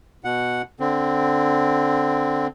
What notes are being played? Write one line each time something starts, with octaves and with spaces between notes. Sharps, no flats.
B2 F#5
D3 C4